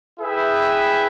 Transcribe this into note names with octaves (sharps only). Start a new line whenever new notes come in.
E4 G#4 B4 E5 G5